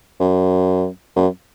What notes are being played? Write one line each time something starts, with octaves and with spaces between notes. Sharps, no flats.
F#2
F#2